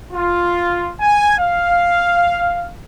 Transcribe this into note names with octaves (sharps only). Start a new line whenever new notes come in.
F4
G#5
F5